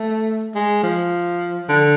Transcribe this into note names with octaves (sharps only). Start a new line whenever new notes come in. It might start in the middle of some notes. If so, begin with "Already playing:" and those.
Already playing: A3
G#3
F3
D3